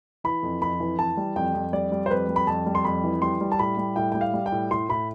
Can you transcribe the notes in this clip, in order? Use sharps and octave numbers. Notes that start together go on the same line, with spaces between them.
E3 B5
F2
F2 B5
E3
E3 A5
G3
F2 G5
F2
G3 D5
G3
C5
F2 B4
G3
B5
F2 A5
G3
C6
F2 B5
E3
G3 C6
G3
A5
A2 B5
G3
A2 G5
G3 G5
F5
G3
G5
A2
A2 C6
A2 B5